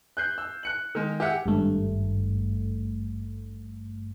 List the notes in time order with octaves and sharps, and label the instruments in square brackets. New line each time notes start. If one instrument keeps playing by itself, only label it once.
[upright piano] F#6 G6 C7
E6
F#6 C#7 F#7
D#3 G#3
G4 G#4 E5 F#5
[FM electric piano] G#1 G2 A3